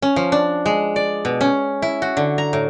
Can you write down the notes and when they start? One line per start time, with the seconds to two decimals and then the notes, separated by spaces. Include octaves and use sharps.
0.02 C#4
0.16 F3
0.32 D4
0.66 G#3
0.96 D5
1.25 B2
1.41 C#4
1.82 E4
2.02 F#4
2.17 D3
2.38 A#5
2.53 A2